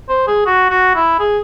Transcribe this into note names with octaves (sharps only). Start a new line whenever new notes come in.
C5
G#4
F#4
F#4
E4
G#4